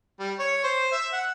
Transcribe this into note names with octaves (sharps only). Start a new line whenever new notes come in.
G3
C#5
C5
E5
F#5